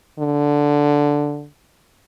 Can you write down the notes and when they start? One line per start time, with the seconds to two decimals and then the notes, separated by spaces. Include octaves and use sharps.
0.19 D3